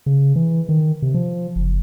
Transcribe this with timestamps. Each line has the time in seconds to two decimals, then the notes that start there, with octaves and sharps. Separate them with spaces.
0.06 C#3
0.36 E3
0.69 D#3
1.02 C3
1.14 F3
1.56 F#1